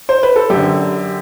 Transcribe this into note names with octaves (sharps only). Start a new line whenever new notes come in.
C5
B4
A4
F#2 D3 G4